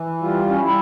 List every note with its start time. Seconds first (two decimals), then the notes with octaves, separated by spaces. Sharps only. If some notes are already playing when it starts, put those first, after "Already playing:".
Already playing: E3
0.21 G3 F4
0.49 C#4
0.60 G3 E4